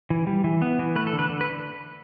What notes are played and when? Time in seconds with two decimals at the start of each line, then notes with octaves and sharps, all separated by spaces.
0.10 E3
0.27 G3
0.44 E3
0.62 B3
0.79 E3
0.96 A3 B4
1.07 A4
1.13 D3
1.19 B4
1.29 D3
1.41 B4